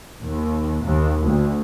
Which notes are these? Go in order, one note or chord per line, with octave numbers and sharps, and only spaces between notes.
D#2
D#2
D2